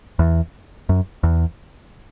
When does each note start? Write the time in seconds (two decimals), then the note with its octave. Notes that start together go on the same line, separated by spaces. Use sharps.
0.19 E2
0.89 F#2
1.23 E2